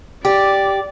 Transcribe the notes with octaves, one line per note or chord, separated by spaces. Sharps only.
G4 D5